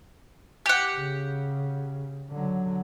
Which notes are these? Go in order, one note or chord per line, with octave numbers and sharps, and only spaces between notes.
G4 F#5
C#3
D3 F#3